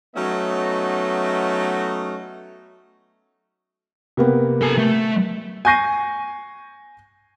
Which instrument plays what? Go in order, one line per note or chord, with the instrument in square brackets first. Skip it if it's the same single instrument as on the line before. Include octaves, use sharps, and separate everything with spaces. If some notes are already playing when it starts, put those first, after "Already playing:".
[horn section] F#3 A3 B3 C#4 D#4 D#5
[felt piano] C3 A#3 B3
[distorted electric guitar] A4 G#5
A3
[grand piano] G#5 C#6 G6 A#6 C7 D#7